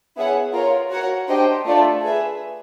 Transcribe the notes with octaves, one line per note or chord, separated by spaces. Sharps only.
B3 E4 G#4 C#5 F#5
F4 A#4 C#5
F#4 A#4 C#5 F#5
D4 G4 C5 D#5 G5
A3 D4 F4 A4 D5
G#4 B4 E5